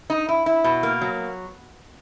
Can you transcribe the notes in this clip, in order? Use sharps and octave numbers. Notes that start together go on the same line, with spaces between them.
D#4
E4
E4
B2
A#3
F#3